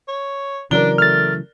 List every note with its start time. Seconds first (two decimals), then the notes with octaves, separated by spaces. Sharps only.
0.08 C#5
0.71 C#3 E3 F#3 D4 A#4 D5 G7
0.98 A3 F6 A6